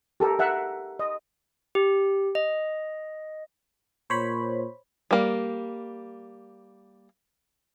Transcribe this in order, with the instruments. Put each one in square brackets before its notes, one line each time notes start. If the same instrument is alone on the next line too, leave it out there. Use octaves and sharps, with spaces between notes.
[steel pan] G4 A4 A#4
A#4 E5 F#5
D#5
[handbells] G4
D#5
[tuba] A#2 [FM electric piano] C5 C#5 B5
[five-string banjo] G3 A#3